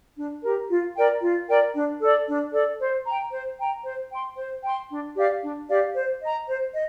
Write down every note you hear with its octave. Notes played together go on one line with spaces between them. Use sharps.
D4
G4 A#4
F4
A#4 D5 G5
F4
A#4 D5 G5
D4
A4 D5
D4
A4 D5
C5
G5 A#5
C5
G5 A#5
C5
G5 C6
C5
G5 C6
D4
G4 D5 F5
D4
G4 D5 F5
C5
D#5 A#5
C5
D#5